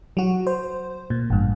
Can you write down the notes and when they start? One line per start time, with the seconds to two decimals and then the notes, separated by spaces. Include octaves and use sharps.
0.17 F#3 F#4
0.47 C5
1.10 A#2
1.30 A1 G2